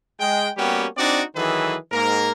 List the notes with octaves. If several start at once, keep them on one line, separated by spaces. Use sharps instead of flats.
G#3 G5
G3 A#3 B3 C#4 F#4 G4
C4 D4 D#4 F#4 D5
D#3 E3 F#3 G#4 A4 B4
G#2 A#3 A#4